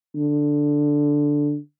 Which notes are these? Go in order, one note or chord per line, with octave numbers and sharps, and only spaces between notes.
D3